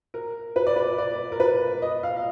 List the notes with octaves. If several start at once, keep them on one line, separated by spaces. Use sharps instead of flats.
A#4
B4
D5
B4
D5
A#4
B4
D#5
F5
F5